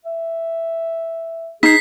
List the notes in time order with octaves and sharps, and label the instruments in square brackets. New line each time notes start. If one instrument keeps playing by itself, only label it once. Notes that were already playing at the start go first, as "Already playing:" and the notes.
[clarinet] E5
[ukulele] D#4 [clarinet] G#4 [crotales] B6 C7